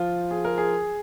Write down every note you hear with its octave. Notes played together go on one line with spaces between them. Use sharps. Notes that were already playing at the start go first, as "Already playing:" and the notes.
Already playing: F3 F4
G#4
A#4
G#4